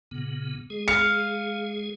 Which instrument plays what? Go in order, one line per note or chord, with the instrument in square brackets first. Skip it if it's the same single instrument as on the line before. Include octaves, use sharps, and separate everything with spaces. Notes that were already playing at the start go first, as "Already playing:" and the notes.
[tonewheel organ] A#2 C#3 B3
G#3 G#4
[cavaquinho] F5 [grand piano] C#7